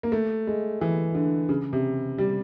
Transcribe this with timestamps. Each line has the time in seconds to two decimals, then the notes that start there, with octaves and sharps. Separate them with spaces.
0.03 A#3
0.12 A3
0.47 G#3
0.81 E3
1.15 D3
1.49 C#3
1.73 C3
2.18 G3